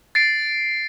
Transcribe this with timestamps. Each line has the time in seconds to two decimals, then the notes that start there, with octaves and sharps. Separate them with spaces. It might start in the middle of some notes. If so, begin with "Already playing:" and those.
0.15 A6 C7 D7